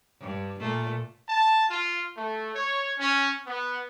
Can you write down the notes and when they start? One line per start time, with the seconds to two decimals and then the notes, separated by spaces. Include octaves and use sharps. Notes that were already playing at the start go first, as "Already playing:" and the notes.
0.21 G2
0.60 A#2 A3
1.29 A5
1.70 F4
2.16 A3
2.54 C#5
2.99 C#4
3.46 B3